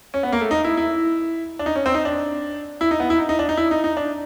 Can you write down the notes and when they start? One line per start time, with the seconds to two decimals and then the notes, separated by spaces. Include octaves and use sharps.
0.14 C#4
0.23 B3
0.32 A#3
0.41 A3
0.51 D#4
0.64 E4
0.77 E4
1.59 D4
1.66 D#4
1.76 C#4
1.86 C4
1.94 D#4
2.05 D4
2.81 E4
2.91 D#4
3.00 B3
3.10 E4
3.19 D#4
3.29 D#4
3.39 D4
3.49 D#4
3.57 E4
3.71 D#4
3.84 D#4
3.97 D4